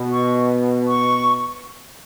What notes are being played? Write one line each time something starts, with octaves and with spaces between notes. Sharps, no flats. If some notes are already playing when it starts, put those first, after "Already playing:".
Already playing: B2
C#6
C#6